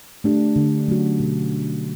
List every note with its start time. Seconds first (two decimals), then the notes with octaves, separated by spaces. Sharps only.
0.24 A3 D4 G4
0.56 D3
0.88 F#3 A3 C#4 F#4
1.20 B2